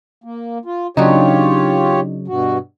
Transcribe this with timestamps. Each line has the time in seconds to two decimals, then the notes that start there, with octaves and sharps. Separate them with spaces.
0.24 A#3
0.65 F4
0.97 C#3 F#3 D4 D#4 F4 G4 C#5
2.28 G2 B2 F#4